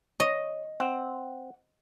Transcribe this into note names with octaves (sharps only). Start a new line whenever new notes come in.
C#5 D#5
C4 F#5